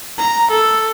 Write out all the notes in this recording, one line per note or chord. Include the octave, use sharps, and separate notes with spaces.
A#5
A4